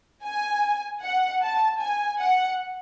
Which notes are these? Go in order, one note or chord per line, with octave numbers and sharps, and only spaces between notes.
G#5
F#5
A5
G#5
F#5